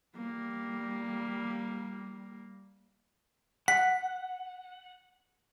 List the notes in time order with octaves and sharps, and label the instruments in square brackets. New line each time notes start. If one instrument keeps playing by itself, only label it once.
[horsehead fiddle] G3 A#3
[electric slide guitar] F#5 [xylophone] B6